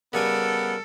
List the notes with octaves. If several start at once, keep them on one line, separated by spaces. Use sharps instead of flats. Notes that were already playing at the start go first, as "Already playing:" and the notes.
C#3 G3 B3 A4 A#4 G#5